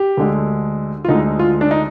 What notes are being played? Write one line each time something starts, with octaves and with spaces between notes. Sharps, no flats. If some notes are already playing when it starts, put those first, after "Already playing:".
Already playing: G4
D2 D3 G#3
F4
D2 D3 G#3 D#4
F4
D4
D#4